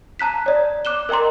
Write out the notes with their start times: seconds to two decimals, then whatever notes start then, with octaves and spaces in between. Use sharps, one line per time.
0.19 A5 A#5 F#6 B6
0.46 C#5 D5
0.85 D6 F#6 E7 G7
1.09 A#4 D#5 G5 A#5 C6